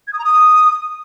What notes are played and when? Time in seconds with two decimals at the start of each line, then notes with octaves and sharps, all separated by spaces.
0.07 G#6
0.13 D#6
0.19 A#5
0.25 D#6